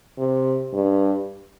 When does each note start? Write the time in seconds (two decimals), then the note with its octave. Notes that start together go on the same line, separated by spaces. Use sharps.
0.18 C3
0.73 G2